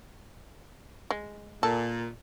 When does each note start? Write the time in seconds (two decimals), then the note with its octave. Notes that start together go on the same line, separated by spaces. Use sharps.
1.11 G#3
1.63 A#2 A4